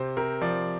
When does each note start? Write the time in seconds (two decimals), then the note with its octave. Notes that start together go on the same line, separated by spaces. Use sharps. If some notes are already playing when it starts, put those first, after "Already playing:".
Already playing: C3 C5
0.17 C3 A#4
0.41 F3 D5